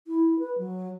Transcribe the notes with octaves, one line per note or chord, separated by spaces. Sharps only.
E4
B4
F#3